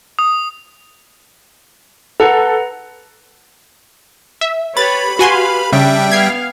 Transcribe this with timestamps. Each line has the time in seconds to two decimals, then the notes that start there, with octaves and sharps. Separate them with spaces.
0.19 D#6
2.20 A4 B4 F#5 A#5
4.41 E5
4.77 G4 B4 C#5 B5 A6
5.19 F#4 G4 B4 F5 G#5 C6
5.72 C#3 G3 C#4 D4 E5 G5
6.12 B3 F5 G#6 C7